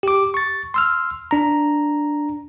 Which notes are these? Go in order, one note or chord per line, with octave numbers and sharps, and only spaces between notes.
G4 D6
C#6 A6
C6 E6 F6
D4 A#5